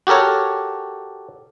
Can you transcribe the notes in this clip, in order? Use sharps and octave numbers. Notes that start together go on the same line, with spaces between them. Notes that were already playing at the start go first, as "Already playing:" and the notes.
F#4 G4 A4 A#4 C#5